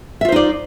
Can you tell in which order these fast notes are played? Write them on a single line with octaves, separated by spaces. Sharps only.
E5 F4 C5 D#4 D5